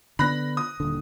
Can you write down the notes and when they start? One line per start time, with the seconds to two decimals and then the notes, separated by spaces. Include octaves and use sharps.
0.19 D3 B3 D4 B5 F#6 A#6
0.57 D#6
0.80 D#1 D3